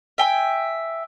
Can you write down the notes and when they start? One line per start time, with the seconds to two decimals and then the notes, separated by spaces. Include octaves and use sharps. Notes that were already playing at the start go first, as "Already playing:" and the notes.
0.18 E5 G5 G#5